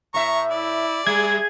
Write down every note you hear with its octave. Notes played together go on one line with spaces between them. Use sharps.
A2 E5 A#5 C#6
E4 D5
G3 G#4 G#6